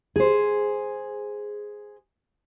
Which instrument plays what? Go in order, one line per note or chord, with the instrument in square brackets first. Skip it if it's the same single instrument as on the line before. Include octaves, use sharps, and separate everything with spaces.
[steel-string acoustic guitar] G#4 C5